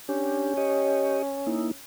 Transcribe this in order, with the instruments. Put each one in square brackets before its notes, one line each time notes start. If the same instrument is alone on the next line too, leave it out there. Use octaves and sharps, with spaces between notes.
[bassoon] C#4 [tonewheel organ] D4 G4
[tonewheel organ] G4 C#5 D#5
A#3 D#4 E4